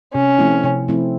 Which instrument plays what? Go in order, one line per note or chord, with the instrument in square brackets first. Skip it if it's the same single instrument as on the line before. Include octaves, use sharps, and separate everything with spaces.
[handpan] C3 [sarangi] C#4
[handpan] F3 A3 C4 E4
C3
F3 A3 C4 E4